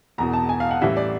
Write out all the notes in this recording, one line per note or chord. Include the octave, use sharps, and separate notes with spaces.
E1 E2 B2 A#5
A5
G#5
F5
F#5
A1 A2 E3 G3 E5
D5